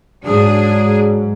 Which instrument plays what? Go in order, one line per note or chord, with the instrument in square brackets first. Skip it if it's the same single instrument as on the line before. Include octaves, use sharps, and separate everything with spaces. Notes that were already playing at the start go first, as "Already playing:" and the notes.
[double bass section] G#2 [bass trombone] F#3 [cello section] D4 G#4